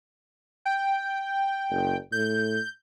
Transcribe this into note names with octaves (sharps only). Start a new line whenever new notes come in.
G5
F#1
A2 G6